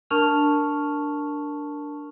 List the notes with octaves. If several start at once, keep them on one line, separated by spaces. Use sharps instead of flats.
D4 A#4 A5 C#6 F6 F7